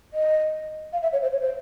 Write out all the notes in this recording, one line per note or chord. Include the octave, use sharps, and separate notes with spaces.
D#5
F5
E5
C#5
C5
C#5
C5